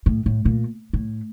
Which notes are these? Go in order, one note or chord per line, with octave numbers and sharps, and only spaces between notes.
A2
A2
A#2
A2